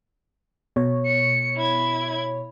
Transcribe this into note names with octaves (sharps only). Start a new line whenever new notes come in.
B2 C#5
C#7
E4 G#6